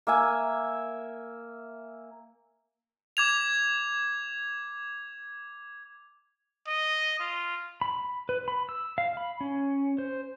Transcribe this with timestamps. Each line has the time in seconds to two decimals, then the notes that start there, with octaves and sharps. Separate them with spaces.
0.07 A#3 E5 G#5
3.17 D6 G#6 F7
6.68 D#5
7.20 F4
7.81 B5
8.29 B4
8.48 B5
8.69 E6
8.98 F5
9.17 B5
9.41 C#4
9.98 C5